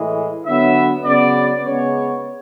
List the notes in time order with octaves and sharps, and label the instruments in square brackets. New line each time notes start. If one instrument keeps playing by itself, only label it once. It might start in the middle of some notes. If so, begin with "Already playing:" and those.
Already playing: [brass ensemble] A2 E3 G#3
D3 F#3 B3 E5
C#3 F#3 B3 D5
C#3 G#3 B3 C#5